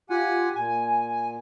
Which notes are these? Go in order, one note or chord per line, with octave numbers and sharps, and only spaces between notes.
F4 G4 F#5 G#5
A#2 G#5